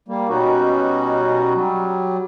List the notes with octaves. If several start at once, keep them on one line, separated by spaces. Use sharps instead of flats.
G3 A#3
B2 G3 C#4 D#4 F#4
F#3 G3